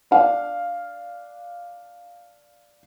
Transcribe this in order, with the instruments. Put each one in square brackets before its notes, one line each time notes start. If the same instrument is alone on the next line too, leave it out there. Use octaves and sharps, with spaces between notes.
[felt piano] D4 F5